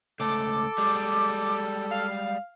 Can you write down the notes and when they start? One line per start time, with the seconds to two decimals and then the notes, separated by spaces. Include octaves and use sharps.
0.20 C#2 A3 A4 D6
0.78 G3 G#3
1.91 F5